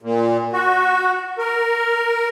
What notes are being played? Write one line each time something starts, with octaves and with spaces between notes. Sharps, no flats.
A#2
F#4
A#4